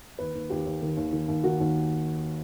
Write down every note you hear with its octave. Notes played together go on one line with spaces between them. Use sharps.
D#2 B4
D#2
D#2 G4
D#2
D#3
D#2
D#3
D#2
D#3 F#4
D#2